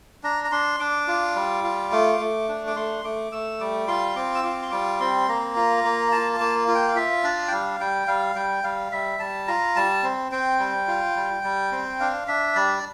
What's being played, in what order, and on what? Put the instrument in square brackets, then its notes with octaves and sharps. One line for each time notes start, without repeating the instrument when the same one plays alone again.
[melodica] D4 A#5
A#5
D4 C6
D4 D6
F4
G3
F4
A3
A3
D4
D6
A3 C6
A3 D6
A3 E6
G3 D6
F4 C6
C4 D6
E6
F4 D6
C6
G3 D6
C4 C6
A#3 A#5
F4
A#3
F4 A5
A5
A#3
F4
G5
F5
F4 E5
D4 D5
G5
G3 F5
G3 G5
G3 F5
G3 G5
G3 F5
G3 E5
G3 A5
F4 A#5
G3 A5
C4
C4 G5
G3
F4
G3
G3
C4
D4 F5
D4 E5
G3 D5